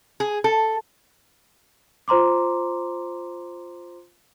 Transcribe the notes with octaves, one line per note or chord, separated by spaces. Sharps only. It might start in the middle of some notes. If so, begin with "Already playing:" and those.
G#4
A4
F4 C5 A#5 C6 D6